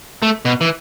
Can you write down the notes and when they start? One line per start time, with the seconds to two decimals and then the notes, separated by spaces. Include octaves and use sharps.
0.22 A3
0.45 B2
0.61 E3